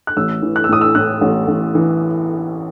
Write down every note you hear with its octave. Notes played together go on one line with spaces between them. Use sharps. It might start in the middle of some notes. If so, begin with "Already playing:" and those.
F#6
A1 E6
E3
F#6
E6
A2 D#6
E6
A2 F#6
A1
A1
E3